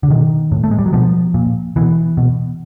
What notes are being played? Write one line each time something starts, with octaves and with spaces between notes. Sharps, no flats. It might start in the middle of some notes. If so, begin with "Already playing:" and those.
D3
B2 D#3
A2
A3
G#3
G3
F#3
B2 F3
A#2
B2 E3
B2